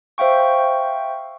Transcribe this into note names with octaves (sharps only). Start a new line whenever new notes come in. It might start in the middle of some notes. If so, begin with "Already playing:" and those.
C5 E5 F5 G5 C#6